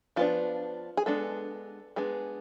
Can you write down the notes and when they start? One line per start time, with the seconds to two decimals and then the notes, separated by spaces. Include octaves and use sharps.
0.16 F3 B3 D4 F4
0.97 G#4
1.06 G#3 B3 D4 A4
1.96 G#3 B3 D4 G#4